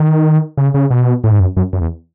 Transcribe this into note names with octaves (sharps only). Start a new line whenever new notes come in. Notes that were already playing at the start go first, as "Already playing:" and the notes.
Already playing: D#3
C#3
C#3
B2
A2
G#2
F#2
F#2
F#2
E2